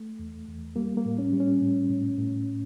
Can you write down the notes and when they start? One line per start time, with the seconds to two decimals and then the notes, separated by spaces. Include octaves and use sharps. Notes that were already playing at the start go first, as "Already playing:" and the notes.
Already playing: A3
0.19 E2
0.48 E2
0.76 G3 A#3
0.97 A#3
1.05 A2
1.19 C#4
1.33 G3
1.40 C#4
1.61 A2
1.90 A2
2.18 A2